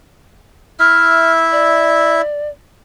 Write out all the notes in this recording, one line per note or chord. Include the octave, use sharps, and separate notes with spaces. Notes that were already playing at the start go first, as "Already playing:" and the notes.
E4 E5 F6
D5